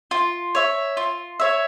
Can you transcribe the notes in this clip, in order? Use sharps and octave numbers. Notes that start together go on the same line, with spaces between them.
F4
C#5 E5
F4
C#5 E5